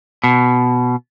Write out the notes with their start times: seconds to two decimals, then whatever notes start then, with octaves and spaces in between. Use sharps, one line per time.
0.24 B2